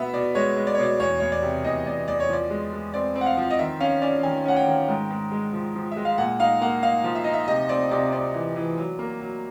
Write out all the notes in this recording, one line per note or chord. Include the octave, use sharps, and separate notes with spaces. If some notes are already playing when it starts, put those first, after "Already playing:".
Already playing: B2 B3 E5 F#5
B2 D5
G#3 C#5
G#3
D5
C#5
B2 D5
E2 C#5
E2 C#5
D5
C3
E2 D#5
E2 D5
E2 D5
C#5
F3 D5
G#3
G#3
C4 D5
C4
F#5
F5
F3
D#5
D#3 E5
C#4 F5
C#4 D5
D#3 G#5
C#4 F#5
G5
D#3
G#2
G#2
G#3
F3
F3
G#3 E5
F5
A#2 F#5
D#4 F5
A#3 F#5
D#4 F5
F3
E5
D#4 D#5
E5
C3 D#5
C4 D5
C3 D5
C4 D5
E3
E3
F#3
A#3
F#3